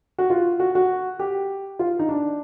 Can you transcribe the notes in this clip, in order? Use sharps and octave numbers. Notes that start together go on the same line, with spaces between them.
F#4
F4
F#4
F#4
G4
F4
D#4
D4